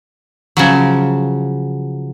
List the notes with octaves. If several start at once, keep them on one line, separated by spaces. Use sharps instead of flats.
C#3 F3 F#3